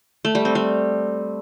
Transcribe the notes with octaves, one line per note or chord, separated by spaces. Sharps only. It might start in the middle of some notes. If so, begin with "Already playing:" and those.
A3
G3
C4
G3